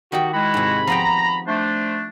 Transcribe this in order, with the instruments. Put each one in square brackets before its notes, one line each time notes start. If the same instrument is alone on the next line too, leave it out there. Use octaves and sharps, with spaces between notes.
[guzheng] D#3 D#4 G4 [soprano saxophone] F#4
[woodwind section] G#3 E4 F#4 [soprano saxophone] B5
[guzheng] G#2 C3
[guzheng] F3 B3 G5 [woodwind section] A#5
[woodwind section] A3 D4 [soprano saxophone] C5